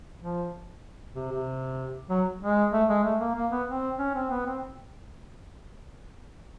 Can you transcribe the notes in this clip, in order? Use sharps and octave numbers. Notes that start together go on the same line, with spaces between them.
F3
C3
C3
F#3
G#3
A3
G#3
A3
A#3
A#3
B3
C4
C#4
C4
B3
C4